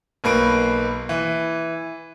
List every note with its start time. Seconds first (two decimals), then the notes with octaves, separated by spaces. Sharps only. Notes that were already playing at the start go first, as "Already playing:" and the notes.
0.24 B1 A#3 B4 D7
1.09 E3